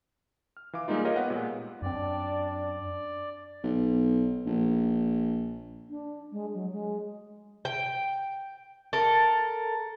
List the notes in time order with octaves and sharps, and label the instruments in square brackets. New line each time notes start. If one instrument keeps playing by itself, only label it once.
[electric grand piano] F6
E3 F5 D6
G3 G#3 A#3 D#4 F4
F4 G4 A#4 C#5 D#5 F5
B3 B4 F#5
A#2 G#3
[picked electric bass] F#2 C4 [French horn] D4 [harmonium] D5
[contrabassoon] B1
A#1
[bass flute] D4
G#3
F#3
G#3
[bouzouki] G5
A4 A#4